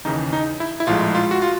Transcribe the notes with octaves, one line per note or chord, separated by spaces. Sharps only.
D#2 C#3 E3 D#4
D#4
E4
E4
A#1 A2 F3 G#3 F4
F4
F#4
F4